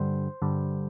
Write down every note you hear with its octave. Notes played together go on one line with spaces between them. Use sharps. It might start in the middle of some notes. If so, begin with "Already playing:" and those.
Already playing: G2 D3 G3 C5
G2 D3 G3